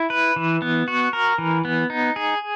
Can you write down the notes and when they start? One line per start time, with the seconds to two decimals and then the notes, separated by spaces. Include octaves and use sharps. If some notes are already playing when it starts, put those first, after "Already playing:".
Already playing: E4
0.10 B4
0.36 E3
0.62 B3
0.88 F#4
1.13 A#4
1.38 E3
1.65 B3
1.90 D#4
2.16 G#4